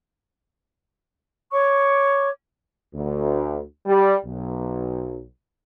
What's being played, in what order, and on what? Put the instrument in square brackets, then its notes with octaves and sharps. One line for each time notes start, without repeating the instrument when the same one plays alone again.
[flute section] C#5 C#6 D6
[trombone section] D2
G3
B1